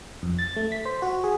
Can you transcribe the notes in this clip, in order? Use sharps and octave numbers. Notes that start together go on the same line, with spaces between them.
F2
A6
A3
B6
C5
F#4
G#4